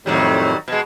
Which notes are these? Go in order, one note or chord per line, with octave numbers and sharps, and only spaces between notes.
F2 A2 D#3 F#3 G3
B2 G#3